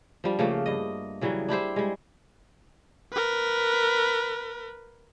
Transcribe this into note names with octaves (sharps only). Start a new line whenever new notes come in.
F3 G3 D4
C#3 F3 A3 A#3
G2 D#5
C#3 E3 F#3 G3
D4 E4 G4 C5
G3 G#3
A#4 B4